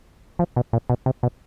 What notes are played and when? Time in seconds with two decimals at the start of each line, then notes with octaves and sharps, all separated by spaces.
0.39 F3
0.56 B2
0.73 A#2
0.90 B2
1.06 C3
1.23 B2